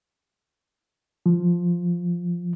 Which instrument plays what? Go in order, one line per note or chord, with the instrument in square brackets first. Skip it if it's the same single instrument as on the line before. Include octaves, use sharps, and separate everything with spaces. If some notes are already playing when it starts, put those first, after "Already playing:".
[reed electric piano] F3